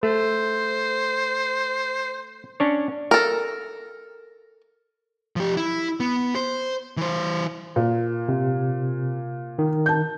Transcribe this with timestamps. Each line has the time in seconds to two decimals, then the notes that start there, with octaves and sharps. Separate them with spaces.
0.03 A3 C5
2.60 C#4 D4 C#5
3.11 A4 A#4
5.36 F3 G4
5.57 E4
6.00 B3
6.35 C5
6.97 E3 C5
7.76 A#2
8.29 C3
9.59 D#3
9.86 A5 G6